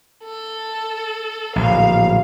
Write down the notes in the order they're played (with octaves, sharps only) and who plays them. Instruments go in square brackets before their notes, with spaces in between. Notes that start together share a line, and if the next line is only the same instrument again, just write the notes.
[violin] A4
[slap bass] D1 A#1 [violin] F5